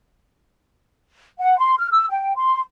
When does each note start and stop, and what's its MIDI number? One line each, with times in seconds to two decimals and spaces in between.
1.40 1.58 78
1.58 1.75 84
1.79 1.88 89
1.92 2.06 88
2.10 2.34 79
2.36 2.60 84